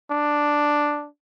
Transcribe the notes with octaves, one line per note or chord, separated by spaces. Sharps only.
D4